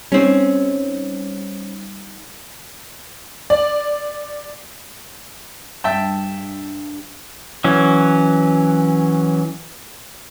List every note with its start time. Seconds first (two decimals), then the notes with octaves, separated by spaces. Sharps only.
0.12 G3 C4 C#4 D#4
3.50 D5
5.84 G2 E5 G5 A5
7.64 E3 F#3 C#4